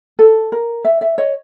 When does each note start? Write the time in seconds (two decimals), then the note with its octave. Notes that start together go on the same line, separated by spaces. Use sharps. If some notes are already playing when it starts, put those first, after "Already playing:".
0.19 A4
0.52 A#4
0.84 D5 E5
1.01 D5 E5
1.18 C#5 D#5